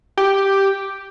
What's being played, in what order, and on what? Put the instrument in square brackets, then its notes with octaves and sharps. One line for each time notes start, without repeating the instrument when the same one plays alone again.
[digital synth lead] G4